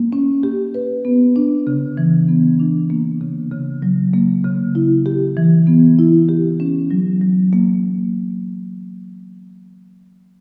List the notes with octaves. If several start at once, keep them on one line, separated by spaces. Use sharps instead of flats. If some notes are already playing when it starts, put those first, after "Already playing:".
Already playing: A#3
C#4
G4
B4
B3
D4
C#3
E3
B3
D4
A#3
C#3
C#3
F#3
A#3
C#3
E4
G4
E3
B3
E4
G4
C#4
F#3
F#3
A#3